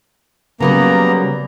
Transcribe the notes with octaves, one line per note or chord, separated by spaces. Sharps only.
C#3 F#3 G3 A#3 B3 A#5